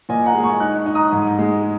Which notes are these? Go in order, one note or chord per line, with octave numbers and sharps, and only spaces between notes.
A#2 D#5 G#5
F#5 A#5
G#3
G#5 C#6
D#4 C#6 F#6
D#4
A#5 D#6
G#2
G#3